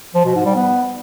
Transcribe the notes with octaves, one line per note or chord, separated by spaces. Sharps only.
F3
B2
G#2
G3
B3